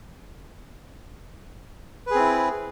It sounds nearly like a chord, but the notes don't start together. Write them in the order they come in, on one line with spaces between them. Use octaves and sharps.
B4 G#4 C4 E4